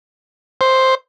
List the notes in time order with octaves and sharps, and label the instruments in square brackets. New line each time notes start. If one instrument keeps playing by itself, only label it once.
[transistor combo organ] C5